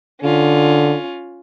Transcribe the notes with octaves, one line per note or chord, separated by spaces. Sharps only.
D3 C#4 F4